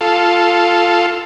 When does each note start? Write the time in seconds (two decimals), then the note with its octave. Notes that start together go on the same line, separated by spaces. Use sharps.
0.01 F4 A4